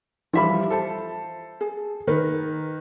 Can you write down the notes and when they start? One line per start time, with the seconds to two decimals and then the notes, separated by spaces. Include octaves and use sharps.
0.33 E3 F3 G3 F4 E5 B5
0.70 A4 C5 A5
1.61 G#4
2.07 D#3 A#4 B4